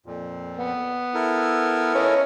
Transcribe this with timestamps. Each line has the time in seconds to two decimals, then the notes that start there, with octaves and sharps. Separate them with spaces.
0.06 F2 A#2
0.57 B3
1.14 E4 A4 A#4
1.95 C#4 D#5